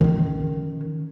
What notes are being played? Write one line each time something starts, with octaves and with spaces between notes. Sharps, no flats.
D#3 C#4